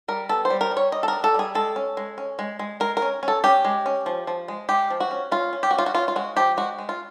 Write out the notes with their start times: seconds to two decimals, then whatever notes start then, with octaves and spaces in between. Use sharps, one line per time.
0.08 G3 A#4
0.29 B3 A4
0.45 C5
0.50 G3
0.61 A#4
0.71 G3
0.77 C#5
0.92 G3 D#5
1.03 A4
1.08 D4 A#4
1.24 A4
1.34 G3 G#4
1.55 G#3 A4
1.76 C#4
1.97 G#3
2.18 C#4
2.39 G#3
2.59 G#3
2.80 G#3 A#4
2.97 A#4
3.02 C#4
3.23 C#4
3.28 A4
3.44 C#4 G4
3.65 G#3
3.86 C#4
4.06 F3
4.27 F3
4.48 G#3
4.69 G#3 G4
4.90 F3
5.00 F#4
5.11 C#4
5.32 C#4 F4
5.53 C#4
5.63 G4
5.71 F#4
5.74 C#4 F4
5.86 F#4
5.95 C#4 F4
6.08 F4
6.16 G#3 F#4
6.37 F3 G4
6.57 G#3 F#4
6.78 G#3
6.89 F4